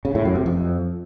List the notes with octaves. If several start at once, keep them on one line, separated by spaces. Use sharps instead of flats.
C#3
A2
F#2
C3
F2